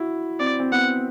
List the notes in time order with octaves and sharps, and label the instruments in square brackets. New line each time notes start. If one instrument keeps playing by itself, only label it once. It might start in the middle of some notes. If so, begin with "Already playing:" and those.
Already playing: [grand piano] E4 F#4
[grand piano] C4 [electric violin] D5
[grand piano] C4
[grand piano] B3 [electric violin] F#5